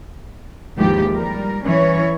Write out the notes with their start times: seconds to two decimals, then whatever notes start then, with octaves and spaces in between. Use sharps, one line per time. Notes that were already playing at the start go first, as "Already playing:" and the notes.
0.77 D#2 G#2 E3 F3 G4
1.13 G3 A#4
1.64 E3 C#4 C#5